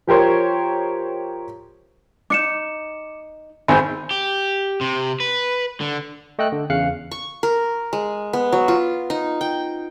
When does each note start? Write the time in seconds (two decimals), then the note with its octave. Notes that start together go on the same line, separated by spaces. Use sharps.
0.07 F3 G4 A#4 C5 C#5
2.30 D4 D#4 D6 C#7 E7
3.68 G#1 C5 G#5 B5
4.11 G4
4.81 C3
5.20 B4
5.81 D3
6.39 A3 D#5 G5 E6 F#6
6.52 D3
6.70 E2 C#3 F5 F#6 C#7
7.11 C#6
7.43 A#4
7.93 G#3
8.33 B3
8.52 F#3
8.68 F4
9.10 D#4
9.41 G5